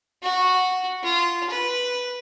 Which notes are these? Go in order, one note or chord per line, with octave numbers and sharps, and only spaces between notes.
F#4
F4
B4